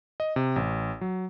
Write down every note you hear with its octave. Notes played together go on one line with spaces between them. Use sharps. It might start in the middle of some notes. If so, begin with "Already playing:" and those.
D#5
C3
A1
F#3